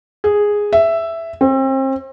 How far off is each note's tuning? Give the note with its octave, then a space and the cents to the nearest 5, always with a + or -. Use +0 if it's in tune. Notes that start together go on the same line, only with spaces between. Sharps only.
G#4 -5
E5 +5
C4 +35